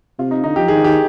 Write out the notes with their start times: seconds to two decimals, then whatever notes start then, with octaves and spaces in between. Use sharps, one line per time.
0.19 C3 F4
0.31 D#4
0.43 D3 D#4
0.56 F3 G4
0.68 D#3 G#4
0.84 D#3 G4